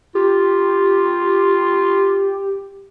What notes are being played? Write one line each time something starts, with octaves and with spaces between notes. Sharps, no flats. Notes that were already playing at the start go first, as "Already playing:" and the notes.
F4 G4